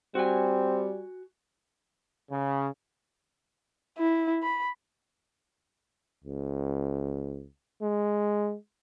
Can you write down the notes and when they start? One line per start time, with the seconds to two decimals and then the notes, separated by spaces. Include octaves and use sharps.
0.15 G3 C4 F#4 G#5
2.30 C#3
3.98 E4
4.43 B5
6.24 C#2
7.82 G#3